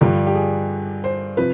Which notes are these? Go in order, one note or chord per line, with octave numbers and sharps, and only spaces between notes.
G2 D3 F3 G4
G4
G#4
C5
C3 F3 B4